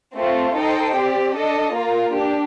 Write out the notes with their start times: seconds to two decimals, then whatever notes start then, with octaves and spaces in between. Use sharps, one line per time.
0.16 A3 C4 F4 A4
0.55 D#4 A4 C5 D#5 G5
0.96 C4 G4 D5
1.35 D4 A4 D#5
1.75 A#3 F4 A#4
2.15 D4 G4